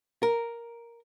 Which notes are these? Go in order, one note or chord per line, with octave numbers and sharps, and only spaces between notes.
A#4